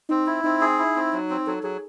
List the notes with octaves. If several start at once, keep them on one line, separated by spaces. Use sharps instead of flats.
C4 D#4
E4
C4 D#4
G#4
E4
C4
F#3
C4
F#3 A4
F#3 G#4